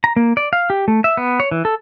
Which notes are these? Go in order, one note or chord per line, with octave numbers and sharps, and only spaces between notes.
A#5
A#3
D5
F5
G4
A3
E5
B3
C#5
E3
A4